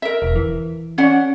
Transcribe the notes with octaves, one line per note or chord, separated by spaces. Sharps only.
A#4 E5
E1
E3
C#4 D5 F#5